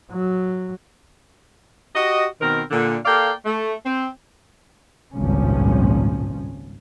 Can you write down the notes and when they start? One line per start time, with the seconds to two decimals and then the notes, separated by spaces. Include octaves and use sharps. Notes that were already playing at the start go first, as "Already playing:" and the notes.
0.12 F#3
1.95 F#4 G4 D#5
2.40 B2 D#3 C4 A#4
2.71 A#2 D3
3.04 A#3 A4 D5 F5 G5
3.45 A3
3.85 C4
5.14 G#1 C#2 G2 A#2 F3 C#4